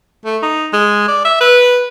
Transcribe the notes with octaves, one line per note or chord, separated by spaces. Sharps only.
A3
D#4
G#3
D5
E5
B4